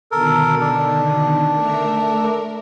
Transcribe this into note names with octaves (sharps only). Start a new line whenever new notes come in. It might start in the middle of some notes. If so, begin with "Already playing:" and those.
B2 D3 D#3 A4 A#4
D4
A3 A#4 E5